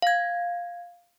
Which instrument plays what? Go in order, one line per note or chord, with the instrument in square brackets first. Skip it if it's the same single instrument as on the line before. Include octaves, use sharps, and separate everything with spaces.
[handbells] F5 G#6